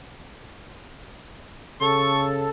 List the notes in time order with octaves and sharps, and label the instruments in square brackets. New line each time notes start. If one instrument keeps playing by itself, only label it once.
[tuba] C#3 [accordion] A4 [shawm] C#6